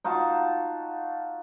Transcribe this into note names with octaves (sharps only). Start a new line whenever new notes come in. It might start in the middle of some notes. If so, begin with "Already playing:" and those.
D#4 F4 F#4 A5